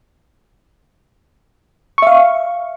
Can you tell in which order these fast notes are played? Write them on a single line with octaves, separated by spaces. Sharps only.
C#6 E5 F5